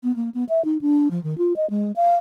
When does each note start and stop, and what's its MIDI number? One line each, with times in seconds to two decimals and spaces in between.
0.04 0.15 59
0.16 0.30 58
0.34 0.44 59
0.49 0.64 76
0.65 0.77 63
0.81 1.11 62
1.11 1.22 53
1.23 1.38 51
1.38 1.53 65
1.56 1.68 75
1.70 1.92 56
1.96 2.15 77